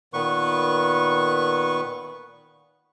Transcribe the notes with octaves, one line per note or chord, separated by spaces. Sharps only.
A#2 D#3 B3 B4 C#6